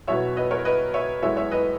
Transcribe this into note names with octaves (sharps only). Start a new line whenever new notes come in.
E2 B2 F#3 B3 C#5 E5
B4 D#5
A#4 C#5
B4 D#5
C#5 E5
F#2 E3 G#3 B3 C#5 E5
C#5 E5
B4 D#5